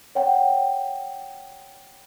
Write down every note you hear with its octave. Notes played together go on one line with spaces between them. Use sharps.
C#5 F#5 G5